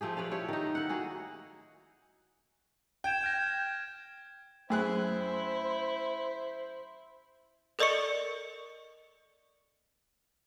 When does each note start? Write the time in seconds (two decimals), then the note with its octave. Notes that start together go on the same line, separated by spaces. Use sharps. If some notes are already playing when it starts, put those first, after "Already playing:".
0.01 F3 A3 G4 G#4
0.17 B4 C#5 D5 F5
0.31 E4 G4 C#5
0.49 D#3 D#4
0.75 E4 F#5
0.89 A#3 F#4 G#4
3.04 G5 G6 G#6 E7
3.24 F6 A#6
4.70 F#2 A3 E4 G#4 C5 F#6
7.79 A4 A#4 D5 D#5 C#6 C#7